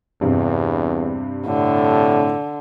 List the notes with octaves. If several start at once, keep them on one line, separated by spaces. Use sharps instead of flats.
E2 G2 C3
A2 D3